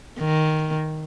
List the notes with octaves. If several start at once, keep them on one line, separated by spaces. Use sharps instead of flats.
D#3